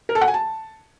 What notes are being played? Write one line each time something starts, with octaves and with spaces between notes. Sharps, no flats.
A#4
A4
F#5
G#5
A5